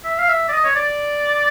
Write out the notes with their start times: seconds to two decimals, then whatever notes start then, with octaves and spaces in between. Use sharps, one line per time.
0.04 E5
0.18 F5
0.28 E5
0.49 D5
0.52 D#5
0.65 C#5
0.75 D5